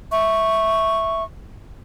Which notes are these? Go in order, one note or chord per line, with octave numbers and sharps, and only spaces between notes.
E5 C#6